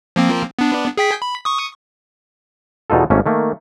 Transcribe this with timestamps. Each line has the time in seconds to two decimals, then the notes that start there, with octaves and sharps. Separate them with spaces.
0.16 F3 A#3 C4
0.59 B3 D4
0.97 G#4 G5 B6
1.22 B5
1.45 C#6 D#6
2.90 E2 B2 D#4 F4 A4
3.10 G#1 A3 A#3 C#4
3.26 D#3 A3 A#3